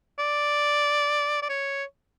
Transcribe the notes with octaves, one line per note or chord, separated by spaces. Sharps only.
D5
D5
C#5